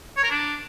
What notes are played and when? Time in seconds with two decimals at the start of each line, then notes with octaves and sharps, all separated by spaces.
0.16 C#5
0.23 A#4
0.30 D4